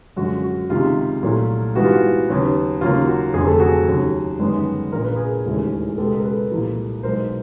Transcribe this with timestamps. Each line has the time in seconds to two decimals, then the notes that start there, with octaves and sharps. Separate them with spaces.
0.16 F#2 D3 F3 G#3 F#4
0.43 F#4
0.70 C#2 C3 D#3 G#3 F4
1.23 C2 A#2 F#3 A3
1.75 G#1 G2 E3 G3 B3 F#4
1.84 F4
1.92 F#4
2.28 D#2 C#3 F#3 B3
2.81 D#2 C#3 F#3 A#3 F4
3.07 F#4
3.34 F1 F2 D3 F#3 G#4
3.47 A4
3.59 F#4 G#4
3.87 D#2 C#3 F#3
4.39 G1 F#2 D#3 G#3 B3
4.92 A#1 A#2 F3 A#4
5.04 B4
5.16 G#4 A#4
5.45 E1 D#2 C#3 E3 A3
5.98 C#2 B2 G#3 B3 G4 A4
6.17 A#4
6.24 A4 B4
6.51 C2 A#2 F3 A#3
7.03 B1 B2 G#3 A#4 C5